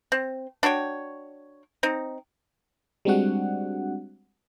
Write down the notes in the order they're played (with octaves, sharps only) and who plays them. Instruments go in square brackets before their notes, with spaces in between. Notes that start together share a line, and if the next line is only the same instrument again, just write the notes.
[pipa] C4
D4 F#4 C#5 G5
C4 D#4
[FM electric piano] G3 G#3 C4 D4 F#4 F#5